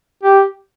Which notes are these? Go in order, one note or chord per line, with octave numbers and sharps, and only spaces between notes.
G4